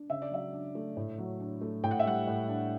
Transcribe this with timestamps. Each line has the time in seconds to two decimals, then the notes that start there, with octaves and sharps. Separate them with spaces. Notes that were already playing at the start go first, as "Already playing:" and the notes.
Already playing: D4
0.10 C#3 E5
0.22 D5
0.31 F#3 E5
0.53 D4
0.75 A3
0.97 A2
1.18 F#3
1.40 D4
1.61 A3
1.83 A2 G5
1.91 F#5
1.99 E5
2.05 G3 F#5
2.27 A2
2.48 D4